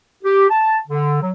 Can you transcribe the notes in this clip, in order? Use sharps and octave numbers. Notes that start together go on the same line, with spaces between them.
G4
A5
D3
F#3